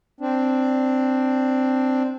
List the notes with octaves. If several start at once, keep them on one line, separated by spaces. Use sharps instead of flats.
C4 D4